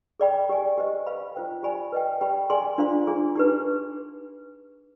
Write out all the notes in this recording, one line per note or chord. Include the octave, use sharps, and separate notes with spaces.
G#4 D5 G5 B5
G4 D5 G#5
G4 C5 D#5
B4 F5 B5
F4 C5 G5
G4 D5 G#5 B5
B4 D#5 G5
G4 D5 G5 B5
G#4 D5 G#5 C6
D4 F4 C5 F5 C6
D4 F4 G#4
D#4 G4 B4